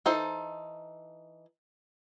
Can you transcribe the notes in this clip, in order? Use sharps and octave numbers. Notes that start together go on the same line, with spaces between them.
E3 D#4 A4 C5